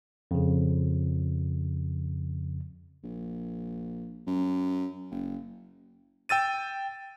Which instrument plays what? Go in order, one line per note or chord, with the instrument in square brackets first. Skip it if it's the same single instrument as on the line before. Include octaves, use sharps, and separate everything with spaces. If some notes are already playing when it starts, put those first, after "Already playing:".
[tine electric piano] F2 C#3
[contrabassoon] A#1
F#2
F#1
[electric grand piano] G5 E6 A6 D#7